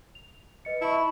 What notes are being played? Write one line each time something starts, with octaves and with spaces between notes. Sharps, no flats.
F7
B4 D#5 C#7
E4 A5 B5 C#6